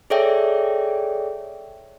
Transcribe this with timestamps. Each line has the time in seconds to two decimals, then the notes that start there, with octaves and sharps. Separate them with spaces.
0.10 G#4 A4 C#5 D5 E5 G5